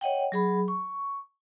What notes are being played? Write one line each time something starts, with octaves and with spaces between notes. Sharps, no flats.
C#5 D#5 F#5 G5
F#3 G#4 B5
C#6